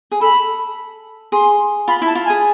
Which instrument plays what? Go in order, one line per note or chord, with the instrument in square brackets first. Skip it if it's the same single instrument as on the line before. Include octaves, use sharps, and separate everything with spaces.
[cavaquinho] G#4
[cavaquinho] A4 [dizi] B5
[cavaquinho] G#4 [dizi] C6
[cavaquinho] F4 [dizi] B5
[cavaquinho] E4
[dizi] A5
[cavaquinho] F4
[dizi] G#5
[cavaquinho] G#4